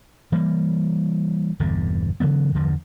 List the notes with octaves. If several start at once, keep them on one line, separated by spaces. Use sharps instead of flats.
E3 G3 A#3
G1 E2 B2 D3
C#3 E3 F#3 B3
E2 G2 D3 F3